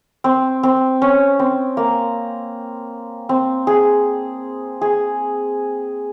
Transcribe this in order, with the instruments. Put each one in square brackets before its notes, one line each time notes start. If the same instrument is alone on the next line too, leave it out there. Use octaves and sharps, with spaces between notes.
[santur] C4
C4
C#4
C4
A#3
C4
G#4
G#4